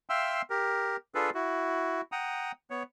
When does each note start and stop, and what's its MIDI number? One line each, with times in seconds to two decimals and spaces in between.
0.10 0.42 76
0.10 0.42 77
0.10 0.42 79
0.10 0.42 84
0.10 0.42 88
0.50 0.96 67
0.50 0.96 70
1.15 1.30 62
1.15 1.30 65
1.15 1.30 68
1.15 1.30 69
1.15 1.30 71
1.34 2.01 64
1.34 2.01 66
2.12 2.52 78
2.12 2.52 79
2.12 2.52 82
2.12 2.52 87
2.70 2.83 59
2.70 2.83 73